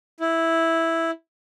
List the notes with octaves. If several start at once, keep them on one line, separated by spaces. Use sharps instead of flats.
E4